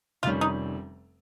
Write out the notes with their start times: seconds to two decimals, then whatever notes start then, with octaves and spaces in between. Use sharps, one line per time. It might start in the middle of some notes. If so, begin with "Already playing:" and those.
0.23 F1 F2 D#3 G3 C#4 F4
0.41 D#4